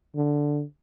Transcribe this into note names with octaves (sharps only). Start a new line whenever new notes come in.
D3